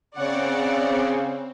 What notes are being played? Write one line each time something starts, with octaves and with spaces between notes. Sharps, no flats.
C#3 C4 C#5 D5 F#5